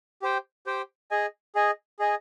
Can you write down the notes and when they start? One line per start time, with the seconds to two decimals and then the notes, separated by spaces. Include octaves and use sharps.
0.22 G4 C5 G5
0.66 G4 C5 G5
1.11 G#4 D#5 G#5
1.55 G#4 D#5 G#5
1.99 G#4 D#5 G#5